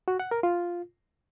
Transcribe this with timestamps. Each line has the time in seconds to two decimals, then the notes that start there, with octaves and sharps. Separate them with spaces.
0.08 F#4
0.20 F#5
0.31 A#4
0.43 F4